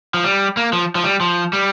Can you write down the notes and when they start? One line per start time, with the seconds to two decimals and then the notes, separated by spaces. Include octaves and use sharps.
0.14 F3
0.24 G3
0.57 A#3
0.73 F3
0.95 F3
1.04 G3
1.21 F3
1.53 G3